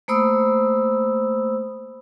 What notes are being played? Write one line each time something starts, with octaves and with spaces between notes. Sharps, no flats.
A3 A#3 C5 B5 D#6 E6